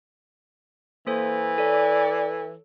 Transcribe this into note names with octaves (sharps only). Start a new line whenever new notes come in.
E3 A#3 A4 C5
A4 C#5 D5